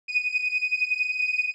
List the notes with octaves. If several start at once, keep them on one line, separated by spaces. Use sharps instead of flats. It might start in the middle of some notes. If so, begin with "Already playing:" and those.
D#7